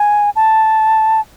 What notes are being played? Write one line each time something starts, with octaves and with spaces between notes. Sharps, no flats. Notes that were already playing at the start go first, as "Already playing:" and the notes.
Already playing: G#5
A5